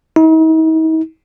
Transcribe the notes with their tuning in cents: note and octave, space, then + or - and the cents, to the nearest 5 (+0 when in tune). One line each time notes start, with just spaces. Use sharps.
D#4 +45